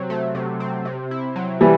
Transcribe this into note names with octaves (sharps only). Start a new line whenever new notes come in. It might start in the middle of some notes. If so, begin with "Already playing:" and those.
Already playing: C3 F#3 C4
A3
C3
C4
C3
E4
F#3
E3 G3 A3